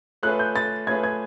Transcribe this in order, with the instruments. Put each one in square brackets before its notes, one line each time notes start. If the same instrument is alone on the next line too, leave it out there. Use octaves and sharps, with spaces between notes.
[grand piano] A3 C#4 F4 G#4 B4 [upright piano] F#6
[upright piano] G6
A6
[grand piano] A3 C#4 F4 G#4 B4 [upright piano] G#6
[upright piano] G#6